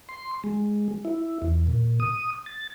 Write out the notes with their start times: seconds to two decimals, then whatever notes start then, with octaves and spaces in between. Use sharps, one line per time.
0.09 C6
0.44 G#3
1.05 E4
1.42 E2
1.67 A#2
2.00 D#6
2.46 A6